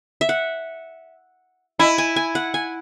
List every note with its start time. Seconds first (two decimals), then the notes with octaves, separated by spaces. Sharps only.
0.21 E5
0.29 F#5
1.79 E4 G#5
1.98 G#5
2.16 G#5
2.35 F#5
2.54 G#5